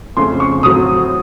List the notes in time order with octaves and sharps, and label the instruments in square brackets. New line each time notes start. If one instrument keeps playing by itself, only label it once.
[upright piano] F2 C#3 A3 C#4 C6
C#6
A2 F#3 C4 D#6